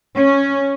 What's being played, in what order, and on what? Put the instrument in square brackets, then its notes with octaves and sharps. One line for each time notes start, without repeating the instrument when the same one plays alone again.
[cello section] C#4